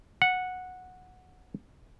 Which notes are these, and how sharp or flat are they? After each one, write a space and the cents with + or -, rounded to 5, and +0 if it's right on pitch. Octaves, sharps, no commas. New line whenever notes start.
F#5 -10